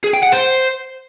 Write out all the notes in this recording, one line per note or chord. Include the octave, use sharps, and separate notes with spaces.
G#4
G5
F#5
C5